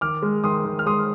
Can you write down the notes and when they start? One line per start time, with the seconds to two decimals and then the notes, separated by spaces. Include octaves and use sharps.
0.01 D#3 D6 F6
0.22 G#3
0.44 D#3 C6 D#6
0.65 D#3
0.79 F6
0.86 G#3 C6 D#6